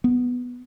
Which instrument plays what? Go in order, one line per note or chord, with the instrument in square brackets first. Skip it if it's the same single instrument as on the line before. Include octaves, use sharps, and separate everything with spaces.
[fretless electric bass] B3